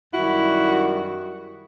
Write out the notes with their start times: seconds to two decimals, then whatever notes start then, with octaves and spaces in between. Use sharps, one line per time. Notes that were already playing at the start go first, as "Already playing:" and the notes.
0.14 F#2 D#3 G3 E4 F#4